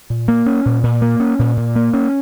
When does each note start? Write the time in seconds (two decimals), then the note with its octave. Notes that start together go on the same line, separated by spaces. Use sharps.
0.10 A#2
0.28 A#3
0.46 C#4
0.65 A#2
0.83 A#2
1.02 A#3
1.20 C#4
1.39 A#2
1.57 A#2
1.76 A#3
1.93 C#4